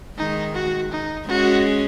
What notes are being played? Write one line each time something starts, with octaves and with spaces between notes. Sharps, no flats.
D#3 G#3 D#4
F#4
D#4
G#3 C#4 F#4